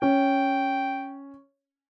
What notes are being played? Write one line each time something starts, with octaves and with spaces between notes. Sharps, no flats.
C#4 G5